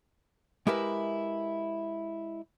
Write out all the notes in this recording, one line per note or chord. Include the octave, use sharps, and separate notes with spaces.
G#3 E4 G4 A#4 B4 E5